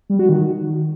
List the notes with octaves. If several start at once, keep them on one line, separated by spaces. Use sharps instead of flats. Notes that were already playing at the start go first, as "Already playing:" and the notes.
G3
F#4
D#3